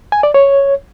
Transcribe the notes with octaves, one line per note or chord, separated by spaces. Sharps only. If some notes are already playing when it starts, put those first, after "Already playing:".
G#5
D5
C#5